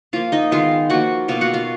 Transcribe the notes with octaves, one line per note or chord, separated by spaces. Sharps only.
F3 A#3 F4 F5
D#4 D#5
D#3 G#3 B3 F4 F5
F3 A#3 F#4 F#5
B2 A#3 F4 F5
F#4 F#5
F4 F5